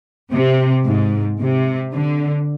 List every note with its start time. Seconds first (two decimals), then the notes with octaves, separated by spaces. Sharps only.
0.32 C3
0.85 G#2
1.40 C3
1.92 D3